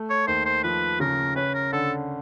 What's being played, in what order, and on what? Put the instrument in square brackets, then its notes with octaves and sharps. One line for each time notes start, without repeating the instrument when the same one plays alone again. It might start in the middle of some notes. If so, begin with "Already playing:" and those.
Already playing: [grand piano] A3
[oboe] C#5
[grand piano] D#2 [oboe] C5
[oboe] C5
[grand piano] F3 [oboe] B4
[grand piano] C#3 [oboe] A#4
[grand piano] C#4 [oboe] B4
[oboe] A#4
[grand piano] D3 [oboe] A4